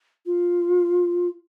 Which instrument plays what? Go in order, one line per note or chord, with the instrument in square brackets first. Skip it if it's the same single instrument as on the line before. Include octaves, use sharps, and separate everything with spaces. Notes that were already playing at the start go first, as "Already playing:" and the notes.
[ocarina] F4